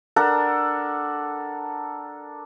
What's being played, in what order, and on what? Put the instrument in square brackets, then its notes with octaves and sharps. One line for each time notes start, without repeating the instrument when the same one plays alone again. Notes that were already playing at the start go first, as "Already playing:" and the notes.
[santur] D4 A4 A#4 F#5